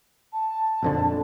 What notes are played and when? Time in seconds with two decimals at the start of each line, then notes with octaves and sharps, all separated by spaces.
0.32 A5
0.83 A#1 F2 D3